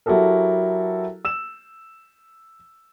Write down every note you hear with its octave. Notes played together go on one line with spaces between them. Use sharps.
F#3 E4 F#4 G4 A4 A#4
E6 E7